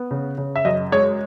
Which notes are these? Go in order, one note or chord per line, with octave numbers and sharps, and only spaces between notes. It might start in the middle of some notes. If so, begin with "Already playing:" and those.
Already playing: B3
C#3
C#3
E5
F#2 D#5
G#3 C#5